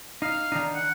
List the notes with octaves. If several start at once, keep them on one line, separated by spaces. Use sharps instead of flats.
D#4 F5
D#3 D4 D#4
F#5